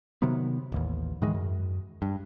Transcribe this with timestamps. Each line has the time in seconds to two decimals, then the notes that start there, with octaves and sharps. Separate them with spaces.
0.22 C3 D#3 F#3 B3
0.72 D1 A1 D#2
1.22 G#2 D#3 E3 G#3
1.34 F#2
2.02 G2